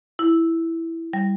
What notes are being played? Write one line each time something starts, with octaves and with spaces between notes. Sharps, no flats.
E4
G3